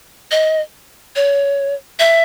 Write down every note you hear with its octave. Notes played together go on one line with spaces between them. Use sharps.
D#5
C#5
E5